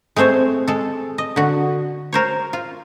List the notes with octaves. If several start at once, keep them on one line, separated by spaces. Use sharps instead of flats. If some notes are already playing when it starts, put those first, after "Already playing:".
G#3 A3 C4 C5 C#5
G#3 A4
D#5
D3 F#4
A#4 C5 C#5
F4